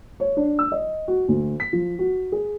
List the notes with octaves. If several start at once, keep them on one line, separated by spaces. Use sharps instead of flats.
C#5
D4
E6
D#5
F#4
D2
B6
F3
F#4
G#4